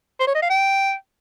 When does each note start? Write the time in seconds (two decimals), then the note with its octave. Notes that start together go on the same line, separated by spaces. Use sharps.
0.20 C5
0.27 C#5
0.35 D#5
0.42 F5
0.50 G5